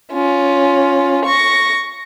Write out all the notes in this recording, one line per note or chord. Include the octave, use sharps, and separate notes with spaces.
C#4 F4
C#6 A#6